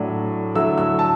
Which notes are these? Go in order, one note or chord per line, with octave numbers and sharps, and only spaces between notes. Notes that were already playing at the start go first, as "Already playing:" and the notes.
Already playing: A2 F#3 D4
D3 F#3 A3 E4 E6
E6
A5